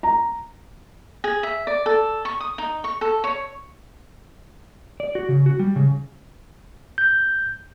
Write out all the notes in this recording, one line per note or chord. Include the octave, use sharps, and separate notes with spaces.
A#5
G#4
E5
D5
A4
C#6
D#6
D#4
C#6
A4
C#5
D5
F#4
C#3
F#4
G3
C#3
G6